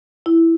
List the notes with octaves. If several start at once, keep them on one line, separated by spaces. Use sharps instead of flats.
E4